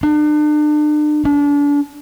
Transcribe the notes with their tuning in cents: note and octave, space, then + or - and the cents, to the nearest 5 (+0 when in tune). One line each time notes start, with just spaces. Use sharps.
D4 +40
D4 -30